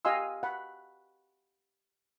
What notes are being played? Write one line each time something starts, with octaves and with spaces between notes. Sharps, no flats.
G4 D#5 F5 G#5 C6 E6
F#5 B5